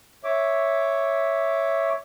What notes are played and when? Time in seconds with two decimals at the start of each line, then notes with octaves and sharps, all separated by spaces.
0.24 C#5 E5 D6